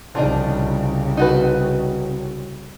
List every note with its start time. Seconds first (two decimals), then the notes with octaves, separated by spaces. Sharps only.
0.15 C2 C#3 F3 D4 D#4
1.17 D#4 F#4 B4